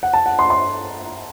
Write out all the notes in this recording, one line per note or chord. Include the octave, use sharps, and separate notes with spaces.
F#5
A5
F#5
C6
C6